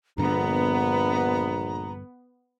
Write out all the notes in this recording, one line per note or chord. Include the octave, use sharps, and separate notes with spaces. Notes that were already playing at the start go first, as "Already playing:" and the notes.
A#1 G2 D3 B3 A#5